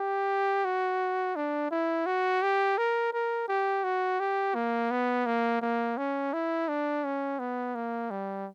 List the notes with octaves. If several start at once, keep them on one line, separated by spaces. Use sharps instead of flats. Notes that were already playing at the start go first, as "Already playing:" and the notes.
Already playing: G4
F#4
D4
E4
F#4
G4
A#4
A#4
G4
F#4
G4
A#3
B3
A#3
A#3
C#4
E4
D4
C#4
B3
A#3
G3